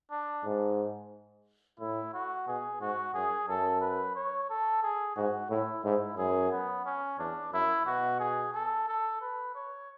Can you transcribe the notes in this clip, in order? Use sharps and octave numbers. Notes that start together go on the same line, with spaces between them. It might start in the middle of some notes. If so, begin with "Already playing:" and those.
D4
G#2
A2 E4
F#4
B2 G#4
G#2 F#4
F#2 G#4
F#2 A4
B4
C#5
A4
G#4
G#2 F#4
A2 E4
G#2 E4
F#2 G#4
B3
C#4
E2 D4
F#2 E4
B2 F#4
G#4
A4
A4
B4
C#5